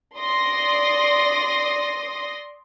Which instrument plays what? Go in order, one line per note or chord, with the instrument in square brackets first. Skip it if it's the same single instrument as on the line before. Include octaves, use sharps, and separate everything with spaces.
[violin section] D5 C6 D#6 A#6